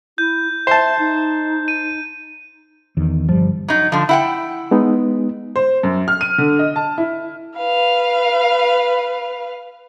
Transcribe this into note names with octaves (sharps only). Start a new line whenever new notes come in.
E4 G6
C5 E5 A5
D#4
D#7
E2 D#3
G1 F3 G3
F#3 D#4
D3 F3
E4 F#5 G5
G#3 B3 D#4
C5
F#2
F6
D#7
D3
D#5
A5
E4
B4 F5